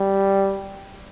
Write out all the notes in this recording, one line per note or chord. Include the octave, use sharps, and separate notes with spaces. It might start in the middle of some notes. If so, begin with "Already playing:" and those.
Already playing: G3